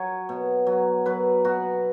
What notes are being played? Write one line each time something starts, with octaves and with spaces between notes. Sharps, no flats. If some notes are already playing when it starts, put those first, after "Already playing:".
Already playing: F#3 C#5
B2
F#3
F#3 B4
B2 F#4